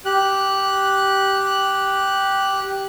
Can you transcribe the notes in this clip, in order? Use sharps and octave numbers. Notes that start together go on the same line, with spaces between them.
G4 F#6